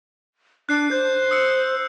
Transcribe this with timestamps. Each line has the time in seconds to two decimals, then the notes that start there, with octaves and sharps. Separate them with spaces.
0.69 D4 F#6 C7
0.91 C5 G6
1.31 D#6 E6 C#7